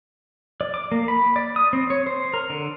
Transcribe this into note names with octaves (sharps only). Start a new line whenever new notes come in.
D5
D6
A#3
B5
D5
D#6
C4
C#5
C5
A#4
D3